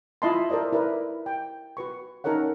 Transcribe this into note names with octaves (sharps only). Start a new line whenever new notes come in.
E4 F4 D#5 A5 B5 C6
A4 A#4 C5 D5 D#5
E4 A#4 B4 D5
G5
F#4 B4 C#6
C#4 D#4 A4 A#4 C#5 F#5